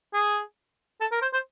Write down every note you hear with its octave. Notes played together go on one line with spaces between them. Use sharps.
G#4
A4
A#4
C5
C5